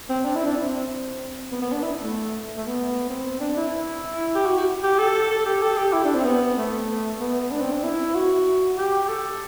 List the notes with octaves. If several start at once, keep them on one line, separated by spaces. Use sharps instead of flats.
C4
D4
E4
D4
C4
B3
B3
D4
E4
A3
A3
B3
C4
D4
E4
G4
F#4
F#4
G4
A4
A4
G4
A4
G4
E4
D4
C4
B3
A3
B3
D4
C4
D4
E4
F#4
G4
A4